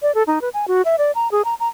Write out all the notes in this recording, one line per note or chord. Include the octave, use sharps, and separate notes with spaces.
D5
A4
D#4
B4
G#5
F#4
E5
D5
A#5
G#4
A#5
A#5